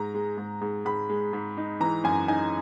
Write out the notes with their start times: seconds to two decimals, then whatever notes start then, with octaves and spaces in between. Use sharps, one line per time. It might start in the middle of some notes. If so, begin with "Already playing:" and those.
Already playing: G#2 A#5
0.14 G#3
0.38 G#2
0.61 G#2
0.85 G#2 B5
1.09 G#3
1.33 G#2
1.57 D#4
1.80 E3 A#5
2.04 F#2 G#5
2.28 D#4 G#5